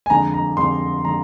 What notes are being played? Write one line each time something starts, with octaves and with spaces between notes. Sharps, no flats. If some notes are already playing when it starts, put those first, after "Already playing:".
G#5
F2 D3 G#3 A#5
A#5
F2 D3 G#3 C6
D3 G#3 A#5